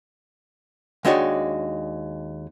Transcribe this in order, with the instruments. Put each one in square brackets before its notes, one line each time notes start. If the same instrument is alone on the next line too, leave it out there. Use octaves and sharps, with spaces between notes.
[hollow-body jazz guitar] D#2 G#3 D4 D#4 F#4 C#5